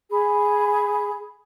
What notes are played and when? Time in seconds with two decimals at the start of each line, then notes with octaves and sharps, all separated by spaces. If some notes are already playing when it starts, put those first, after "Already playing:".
0.11 G#4 B5